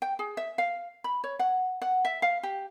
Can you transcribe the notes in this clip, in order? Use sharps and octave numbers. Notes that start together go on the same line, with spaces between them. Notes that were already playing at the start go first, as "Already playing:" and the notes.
G5
G#4
E5
F5
B5
C#5
F#5
F#5
E5
F5
G4